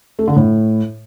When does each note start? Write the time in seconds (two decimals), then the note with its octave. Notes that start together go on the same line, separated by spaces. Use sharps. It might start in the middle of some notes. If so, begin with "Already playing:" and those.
0.19 A3
0.28 D3
0.36 A2